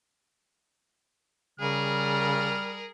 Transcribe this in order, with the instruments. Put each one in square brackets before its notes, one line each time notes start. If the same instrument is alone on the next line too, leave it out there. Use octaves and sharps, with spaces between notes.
[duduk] C#3 [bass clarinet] G3 [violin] G#4 A#4 [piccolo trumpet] F6